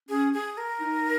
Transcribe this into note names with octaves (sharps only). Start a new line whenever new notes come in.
C#4 G#4
G#4
A#4
D#4